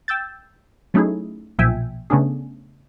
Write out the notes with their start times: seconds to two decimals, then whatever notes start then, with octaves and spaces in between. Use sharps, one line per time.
0.08 G5 E6 G6 A6
0.94 F#3 A3 C#4 D#4 E4 G#4
1.59 B1 A#2 F3 E5 G5 G#5
2.10 C#3 A3 B3 C#4 D4 G#4